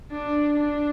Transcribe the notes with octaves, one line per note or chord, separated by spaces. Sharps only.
D4
D4